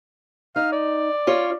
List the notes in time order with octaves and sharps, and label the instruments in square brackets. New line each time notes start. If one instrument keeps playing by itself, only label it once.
[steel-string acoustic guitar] D#4 [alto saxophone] F5
[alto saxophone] D5
[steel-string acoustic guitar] C#4 F4 C#5